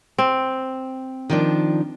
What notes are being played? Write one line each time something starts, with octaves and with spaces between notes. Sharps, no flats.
C4
D#3 F3 D4